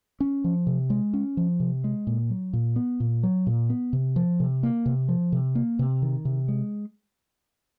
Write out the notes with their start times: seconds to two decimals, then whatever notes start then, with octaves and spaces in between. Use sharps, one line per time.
0.20 C#4
0.44 F3
0.67 C3
0.90 G#3
1.13 C#4
1.37 F3
1.60 C3
1.84 G#3
2.07 A#2
2.30 F#3
2.53 A#2
2.76 B3
3.00 A#2
3.23 F#3
3.47 A#2
3.70 B3
3.93 C3
4.16 F3
4.40 C3
4.63 A#3
4.86 C3
5.08 F3
5.32 C3
5.55 A#3
5.79 C3
6.02 D#3
6.25 C3
6.48 G#3